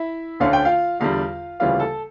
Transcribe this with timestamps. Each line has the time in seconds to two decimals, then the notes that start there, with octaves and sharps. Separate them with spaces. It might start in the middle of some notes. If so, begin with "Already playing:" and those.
Already playing: E4 E5
0.40 D2 D3 A3 C#4 F5
0.53 G5
0.65 F4 F5
1.00 E2 D3 G3 F4 F5
1.60 D2 C#3 E3 G3 A#3 F4 F5
1.80 A4 A5